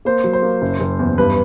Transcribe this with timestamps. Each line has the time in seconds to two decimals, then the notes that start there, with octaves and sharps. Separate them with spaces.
0.05 A#3 C5
0.24 F#3
0.33 C5
0.42 A#3
0.61 F#1
0.80 F#1
0.99 E2
1.18 G2 B4